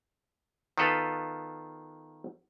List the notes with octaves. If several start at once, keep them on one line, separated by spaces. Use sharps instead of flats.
D#3 B3 F4 A4 B4 F5